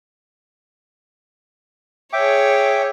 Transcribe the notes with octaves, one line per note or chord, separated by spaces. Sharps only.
G#4 C#5 E5 G5 D6